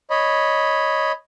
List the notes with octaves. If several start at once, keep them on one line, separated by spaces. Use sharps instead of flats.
C#5 D#5 B5